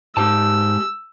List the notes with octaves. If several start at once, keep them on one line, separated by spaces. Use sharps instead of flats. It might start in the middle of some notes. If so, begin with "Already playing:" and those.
G#2 G#3 G4 A5 E6